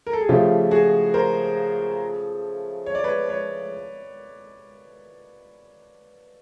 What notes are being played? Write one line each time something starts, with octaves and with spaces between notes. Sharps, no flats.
A#4
A4
G#4
C#3 F3 A3 F4 G4
F#4 G#4
A#4 C5
C#5
D5
B4 C#5
B4 C#5